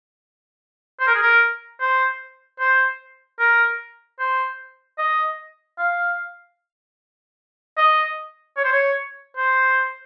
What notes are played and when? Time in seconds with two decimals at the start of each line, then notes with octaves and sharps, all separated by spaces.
1.00 C5
1.07 A#4
1.15 G#4
1.22 A#4
1.80 C5
2.59 C5
3.39 A#4
4.19 C5
4.98 D#5
5.78 F5
7.77 D#5
8.57 C#5
8.64 C5
8.72 C#5
9.37 C5